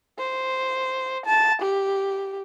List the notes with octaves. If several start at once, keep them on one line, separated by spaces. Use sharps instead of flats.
C5
A5
G4